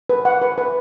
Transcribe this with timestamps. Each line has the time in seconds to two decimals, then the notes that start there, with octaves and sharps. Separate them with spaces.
0.09 B4
0.25 F#5
0.42 B4
0.58 B4